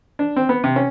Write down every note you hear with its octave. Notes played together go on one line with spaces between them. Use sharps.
D4
C4
B3
C3
C#4